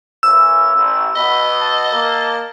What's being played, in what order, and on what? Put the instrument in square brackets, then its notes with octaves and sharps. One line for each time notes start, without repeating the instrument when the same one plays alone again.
[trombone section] E3 A#3 C#4 [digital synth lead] E6
[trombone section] A1
[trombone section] B2 [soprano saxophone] D#5 [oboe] B5
[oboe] A5
[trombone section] A#3